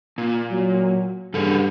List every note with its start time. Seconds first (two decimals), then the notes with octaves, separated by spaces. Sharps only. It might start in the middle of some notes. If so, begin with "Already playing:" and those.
0.18 A#2
0.51 F#3
1.34 G2 C#3 A4